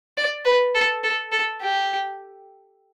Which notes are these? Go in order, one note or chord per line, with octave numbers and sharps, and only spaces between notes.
D5
B4
A4
A4
A4
G4